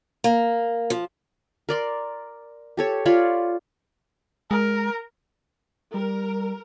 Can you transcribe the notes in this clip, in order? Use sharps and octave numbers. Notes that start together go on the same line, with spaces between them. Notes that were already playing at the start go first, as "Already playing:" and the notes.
A#3
F3
A#4 D5 C6
G4 A4 C#5
F4 C#5 D5 B5
G#3 A#4
G3 A#4